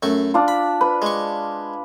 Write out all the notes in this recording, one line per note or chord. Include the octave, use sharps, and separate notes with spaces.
F#2 A3 C#6
D4 F4
B5
B4
G#3 C#6